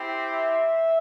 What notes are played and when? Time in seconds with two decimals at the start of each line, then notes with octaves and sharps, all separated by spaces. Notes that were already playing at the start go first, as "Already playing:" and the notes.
Already playing: C4 E4 G4
0.24 E5